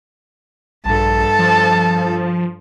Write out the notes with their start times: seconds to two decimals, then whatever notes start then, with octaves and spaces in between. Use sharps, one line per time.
0.85 A#1 G2 A4 A5
1.39 F3